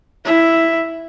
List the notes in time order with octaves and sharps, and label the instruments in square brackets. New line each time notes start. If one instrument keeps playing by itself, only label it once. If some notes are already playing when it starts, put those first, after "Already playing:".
[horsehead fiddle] E4 E5